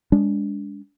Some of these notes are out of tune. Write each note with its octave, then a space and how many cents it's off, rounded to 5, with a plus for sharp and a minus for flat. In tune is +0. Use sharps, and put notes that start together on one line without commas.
G#3 -25 D4 -30